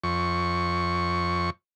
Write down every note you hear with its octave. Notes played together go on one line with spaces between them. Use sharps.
F2 C#6